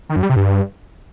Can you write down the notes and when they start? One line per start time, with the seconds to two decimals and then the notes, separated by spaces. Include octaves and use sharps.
0.10 D#3
0.16 F#2
0.23 G3
0.30 C3
0.36 G2